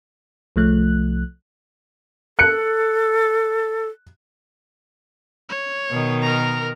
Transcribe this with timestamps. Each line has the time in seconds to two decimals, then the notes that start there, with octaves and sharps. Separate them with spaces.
0.56 C2 F3 A3 F#6
2.39 A4 F#6 C#7
5.49 C#5
5.90 B2 D#3
6.22 A#4 A#5